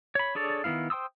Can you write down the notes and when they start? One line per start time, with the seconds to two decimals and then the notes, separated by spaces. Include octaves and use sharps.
0.15 C#5 B5
0.35 D4 G#4 A4 C#5 D5
0.64 D#3 A3 B3 E4 F5
0.90 C5 G5 C6 D#6 E6